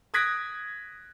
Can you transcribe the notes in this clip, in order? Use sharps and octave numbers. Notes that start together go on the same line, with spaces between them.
D#6 F#6 G#6 A#6 B6 D7